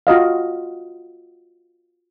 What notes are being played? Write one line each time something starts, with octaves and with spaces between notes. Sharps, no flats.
F4 F#4 D#5 F5